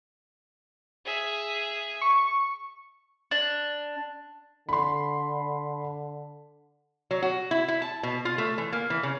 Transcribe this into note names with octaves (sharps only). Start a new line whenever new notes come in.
G#4 E5
C#6
D4
D3 B5 C6
F#3
F#4
E4
E4
A5
B2
F4
A3
E3
A#3
E3
C#3